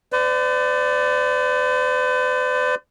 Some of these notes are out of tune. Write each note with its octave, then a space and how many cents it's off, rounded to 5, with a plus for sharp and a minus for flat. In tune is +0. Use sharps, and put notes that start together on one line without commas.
B4 +45 D5 +0